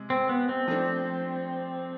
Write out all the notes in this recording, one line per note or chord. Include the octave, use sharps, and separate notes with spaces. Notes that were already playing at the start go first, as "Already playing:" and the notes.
Already playing: C3 G#3
C4
B3
C4
F3 A3 D4